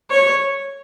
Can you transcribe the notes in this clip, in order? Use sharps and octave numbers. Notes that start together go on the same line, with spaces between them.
C#5